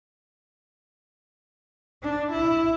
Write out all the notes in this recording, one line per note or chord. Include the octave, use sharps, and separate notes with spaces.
D4
E4